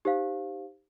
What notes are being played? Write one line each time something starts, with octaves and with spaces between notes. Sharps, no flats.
D#4 G4 C5 F5